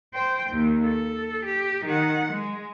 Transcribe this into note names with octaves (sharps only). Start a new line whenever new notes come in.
C5 G5
D#2
A4
G4
D#3 F#5
G#3